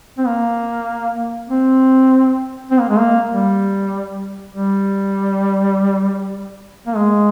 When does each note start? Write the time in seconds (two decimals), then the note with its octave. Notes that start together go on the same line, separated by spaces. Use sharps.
0.18 C4
0.27 A#3
1.49 C4
2.71 C4
2.80 A#3
2.89 G#3
2.99 A#3
3.32 G3
4.53 G3
6.87 A#3
6.96 G#3